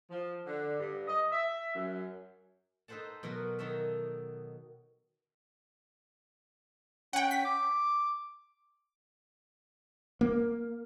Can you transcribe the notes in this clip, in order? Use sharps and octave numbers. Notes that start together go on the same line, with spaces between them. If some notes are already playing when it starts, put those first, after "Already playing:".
F3
D3
G2
D#5
E5
F#2
D#4 A4 B4 C5 F#5 A5
B2 F#3 B3 F#4 A#4
D#3 D#4 F#4 A4 E5
C#4 F#5 G5
B6
D6
A#3